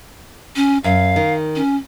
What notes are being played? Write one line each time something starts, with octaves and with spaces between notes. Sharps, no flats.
C#4
F#2 F5
D#3
C#4